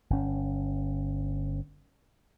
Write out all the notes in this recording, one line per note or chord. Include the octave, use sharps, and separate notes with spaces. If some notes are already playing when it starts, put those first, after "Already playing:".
G1 C#4